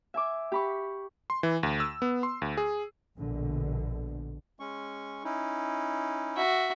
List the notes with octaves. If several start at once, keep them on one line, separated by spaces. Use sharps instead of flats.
E5 G#5 D6
G4 B5 C#6
C6
E3
D2
E6
B3
C6
D2
G#4
A#1 B2 D3
G#3 C#4 C#6
C#4 D#4 E4
F#4 E5